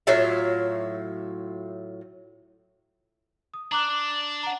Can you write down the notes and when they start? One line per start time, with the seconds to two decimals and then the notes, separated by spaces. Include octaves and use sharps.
0.07 A2 F#3 F4 E5
3.54 D#6
3.72 D4 A#5 D6 F#6
4.43 F#5 A#5